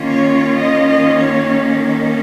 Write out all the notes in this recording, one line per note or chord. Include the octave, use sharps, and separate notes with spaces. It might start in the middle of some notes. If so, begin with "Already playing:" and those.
Already playing: D#3 A#3 C#4 F4
C#5
D#5
D#5
C#5